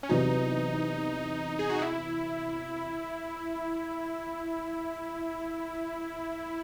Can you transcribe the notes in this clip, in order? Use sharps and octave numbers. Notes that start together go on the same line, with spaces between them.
C#4
E2 C3 F#3 D#4
G#4
F#4
E4